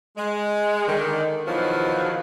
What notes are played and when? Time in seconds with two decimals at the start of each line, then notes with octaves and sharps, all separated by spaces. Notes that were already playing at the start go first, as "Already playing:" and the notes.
0.17 G#3
0.87 D3 D#3
1.46 E2 B2 D#3 F3 F#3